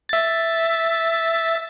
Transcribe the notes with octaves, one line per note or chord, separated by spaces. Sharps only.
E5 A6